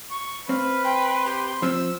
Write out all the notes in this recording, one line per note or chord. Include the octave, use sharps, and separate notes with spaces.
C#6
C4 B4 F5
G5 C6
G4
F3 C4 E6